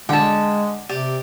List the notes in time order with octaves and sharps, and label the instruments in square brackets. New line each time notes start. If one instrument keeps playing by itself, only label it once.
[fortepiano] D3 [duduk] G#3 [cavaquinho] G5 A5
[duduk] C3 [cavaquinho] G4 D5